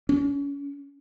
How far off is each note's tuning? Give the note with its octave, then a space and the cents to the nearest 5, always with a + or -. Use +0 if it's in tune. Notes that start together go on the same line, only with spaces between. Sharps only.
C#4 +30